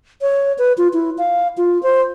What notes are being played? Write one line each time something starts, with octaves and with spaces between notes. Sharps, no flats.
C#5
B4
F4
E4
F5
F4
C5